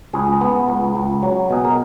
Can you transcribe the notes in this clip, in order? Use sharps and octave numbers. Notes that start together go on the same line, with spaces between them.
C#2 G#4
B3
C#2
C#2
F#3
B2 G#4
A#4